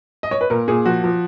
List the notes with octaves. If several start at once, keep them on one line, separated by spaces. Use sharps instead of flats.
D#5
C#5
B4
A#2 A#4
A#2 G#4
F3 F#4
F3